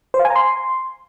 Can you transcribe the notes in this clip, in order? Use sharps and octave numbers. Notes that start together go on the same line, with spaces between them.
C5
F5
G#5
A#5
C6